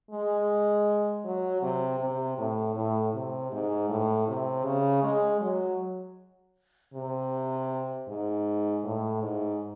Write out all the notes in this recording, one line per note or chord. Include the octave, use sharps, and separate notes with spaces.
G#3
F#3
C3
C3
A2
A2
C3
G#2
A2
C3
C#3
G#3
F#3
C3
G#2
A2
G#2